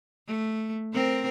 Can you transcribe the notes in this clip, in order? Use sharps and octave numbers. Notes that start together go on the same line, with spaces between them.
A3
C4 A#4 C5